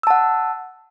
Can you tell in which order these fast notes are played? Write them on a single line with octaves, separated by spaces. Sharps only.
E6 A5 F#5